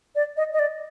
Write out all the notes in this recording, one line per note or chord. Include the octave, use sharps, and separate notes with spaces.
D5
D#5
D#5
D5